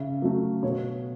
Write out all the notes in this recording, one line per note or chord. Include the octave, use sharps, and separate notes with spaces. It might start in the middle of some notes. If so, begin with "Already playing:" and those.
Already playing: C#3 E5
F#3 A3
B2 C#5